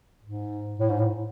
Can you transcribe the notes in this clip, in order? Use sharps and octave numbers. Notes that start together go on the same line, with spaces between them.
G#2
A2
G#2
A2